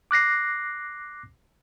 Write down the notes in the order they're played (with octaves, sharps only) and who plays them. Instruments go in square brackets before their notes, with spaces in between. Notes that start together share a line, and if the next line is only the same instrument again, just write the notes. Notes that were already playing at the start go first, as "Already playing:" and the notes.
[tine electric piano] D6 F#6 A#6 C7